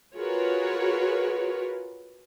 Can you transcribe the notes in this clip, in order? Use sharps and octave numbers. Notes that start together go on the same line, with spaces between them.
F4 F#4 G#4 A#4 B4 C#5